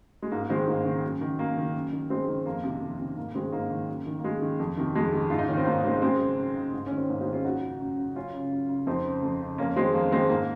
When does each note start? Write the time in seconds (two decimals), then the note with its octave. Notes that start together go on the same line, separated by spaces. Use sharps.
0.22 G#3
0.31 G#2 A#3
0.50 D#3 G#3 C4
0.67 G#2 A#3
0.85 D#3
1.03 F#2
1.21 D#3
1.39 F#2 A#3
1.57 D#3
1.75 F#2
1.93 D#3
2.10 F#2 G#3 C4
2.28 D#3
2.46 F2 A#3
2.64 C3 D#3
2.82 F2
2.99 C3 D#3
3.17 G#2 A#3
3.35 D#3 G#3 C4
3.52 G#2 A#3
3.70 D#3
3.89 F#2
4.06 D#3
4.19 A#3
4.24 F#2 G#3
4.42 D#3
4.59 F2
4.77 C3 D#3
4.95 F2 G#3
5.13 C3 D#3
5.30 G#2 F4
5.38 D#4
5.48 D#3 C#4
5.57 C4
5.66 G#2 A#3
5.84 D#3 G#3 C4
6.02 F#2 G#3 C4
6.20 C#3
6.38 F#2
6.56 C#3
6.73 G#2
6.86 D#3 C#4
6.97 C4
7.09 G#2 A#3
7.21 G#3 C4
7.27 D#3
7.33 C#4 F4
7.45 F#2 D#4 F#4
7.62 C#3
7.80 F#2
7.98 C#3
8.16 F#2 C#4 F4
8.34 C#3
8.52 F#2
8.69 C#3
8.87 F2 C4 D#4
9.05 C#3
9.23 F2
9.41 C#3
9.58 F2 A#3 C#4
9.76 D#3 G#3 C4
9.94 F2 A#3
10.12 D#3 G#3 C4
10.29 G#2 A#3